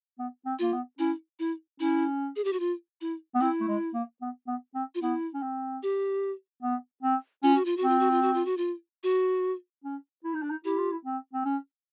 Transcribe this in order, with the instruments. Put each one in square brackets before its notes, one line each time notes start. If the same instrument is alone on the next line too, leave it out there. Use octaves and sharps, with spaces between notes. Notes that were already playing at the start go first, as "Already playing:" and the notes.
[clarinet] B3
C4
[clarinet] A#3 [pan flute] F4
[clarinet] B3
[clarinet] C#4 [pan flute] E4
[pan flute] E4
[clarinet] C#4 [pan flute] E4
[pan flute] G#4
G4
F#4
F4
E4
[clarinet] B3
[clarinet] C4 [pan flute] E4
[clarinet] A3
G#3
A#3
B3
B3
C4
[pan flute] F4
[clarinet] B3 [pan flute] E4
[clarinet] C#4
C4
[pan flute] G4
[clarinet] B3
C4
[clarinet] C#4 [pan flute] F4
[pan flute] F#4
F4
F#4
[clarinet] C4
[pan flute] F4
F#4
F4
F#4
F4
F#4
F4
F#4
[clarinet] C#4
E4
D#4
D4
D#4
[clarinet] E4 [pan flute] G4
[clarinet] F4
E4
C4
C4
C#4